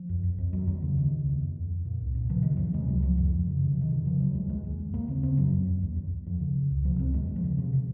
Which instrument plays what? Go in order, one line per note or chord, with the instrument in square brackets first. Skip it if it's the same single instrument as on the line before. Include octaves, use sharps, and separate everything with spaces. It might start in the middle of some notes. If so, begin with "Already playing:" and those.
Already playing: [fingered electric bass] F3
F2
F2
F2
D#2 F#3
D#2 F#3
C#3
D#2 D#3
C#3
D#2
F2
F2
F2
A#2
C2
A#2
C#3 F3
D#2 D#3
D#2 F3
C3 G#3
C#2 F#3
C#2 F3
F2 F3
F2
C#3
F2 D#3
C3 F3
D#3
C3
C#3 F3
D#2 F#3
D#2 G#3
D#2 G#3
D#2
D#2
D#2 A#3
C#3 C4
C#3 C4
F2 F#3
F2
F2
D#2
D#2
D#2
F2 F3
C#3
C#3
C#2
C3 F3
C#2 C4
D#2 G#3
D#2
F3
C#3
C3
C3